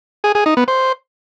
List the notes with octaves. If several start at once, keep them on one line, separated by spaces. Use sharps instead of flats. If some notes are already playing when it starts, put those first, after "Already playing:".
G#4
G#4
D#4
B3
C5